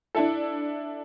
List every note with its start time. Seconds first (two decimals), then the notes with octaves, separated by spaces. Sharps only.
0.15 D4 E4 A4